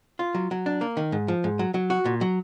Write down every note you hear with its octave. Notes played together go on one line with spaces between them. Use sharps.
F4
F#3
F#3
D4
A#3
D#3
G#2
F3
G#2
F#3
F#3
F#4
A#2
F#3